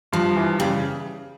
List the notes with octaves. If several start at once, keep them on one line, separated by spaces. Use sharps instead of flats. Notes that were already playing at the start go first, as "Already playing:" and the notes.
G2 F3
E3
C#3 G3